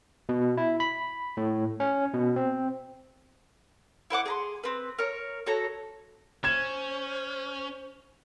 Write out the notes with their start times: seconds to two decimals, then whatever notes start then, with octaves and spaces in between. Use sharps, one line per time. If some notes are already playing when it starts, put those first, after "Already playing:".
0.29 B2
0.57 E4
0.80 B5
1.37 A2
1.80 C#4
2.14 B2
2.36 C4
4.10 E4 C5 F#5 D6
4.26 G#4 A#5 C6
4.64 C4 B4
4.98 A#4 C#5
5.46 F#4 A4 C#5 A#5
6.44 C#4 C5 G#6 E7